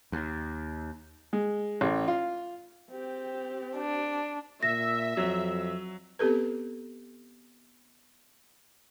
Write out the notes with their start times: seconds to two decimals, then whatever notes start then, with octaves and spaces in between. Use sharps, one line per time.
0.12 D#2
1.33 G#3
1.81 A1
2.08 F4
2.90 C4 G4
3.77 D4
4.63 A#2 E5 A#6
5.17 F2 F#3
6.19 B3 C4 G4 A4 B4